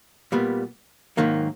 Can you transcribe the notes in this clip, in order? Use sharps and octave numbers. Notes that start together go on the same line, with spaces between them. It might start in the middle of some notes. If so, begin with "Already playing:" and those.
A#2 G3 B3
G#2 D#3 F#3 A#3